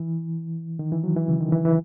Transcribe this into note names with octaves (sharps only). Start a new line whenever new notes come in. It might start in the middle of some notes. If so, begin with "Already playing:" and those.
Already playing: E3
D#3
E3
F#3
E3
C#3
D#3
E3
E3